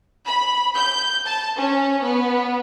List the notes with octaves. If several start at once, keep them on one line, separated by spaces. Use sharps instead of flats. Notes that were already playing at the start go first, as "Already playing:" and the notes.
B5
G6
A5
C#4
B3